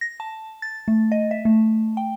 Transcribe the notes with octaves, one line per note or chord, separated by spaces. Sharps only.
A#6
A5
A6
A3
D#5
E5
A3
G5